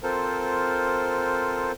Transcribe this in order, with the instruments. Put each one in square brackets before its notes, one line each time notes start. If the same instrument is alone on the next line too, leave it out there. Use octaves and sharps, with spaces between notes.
[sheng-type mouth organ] C4 F4 A4 A#4 C5